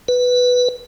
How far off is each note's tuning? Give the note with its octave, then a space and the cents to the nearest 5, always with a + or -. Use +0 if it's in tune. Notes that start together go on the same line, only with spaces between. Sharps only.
B4 +0